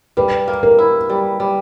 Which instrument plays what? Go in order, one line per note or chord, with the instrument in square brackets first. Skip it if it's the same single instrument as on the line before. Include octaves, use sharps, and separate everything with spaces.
[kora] G3 [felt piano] B4
[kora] A#3
[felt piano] A#4
[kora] E4
G3
G3